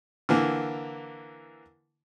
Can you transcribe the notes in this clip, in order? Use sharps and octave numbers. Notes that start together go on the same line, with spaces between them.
D3 E3 A#3